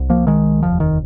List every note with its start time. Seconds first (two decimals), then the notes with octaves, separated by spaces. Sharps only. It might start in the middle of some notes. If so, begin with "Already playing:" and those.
Already playing: C2
0.10 F3 A#3
0.27 D#3 G#3
0.62 F1 D#2 F3
0.80 D#3